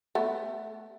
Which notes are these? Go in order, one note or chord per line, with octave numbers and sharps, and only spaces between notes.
A3 B3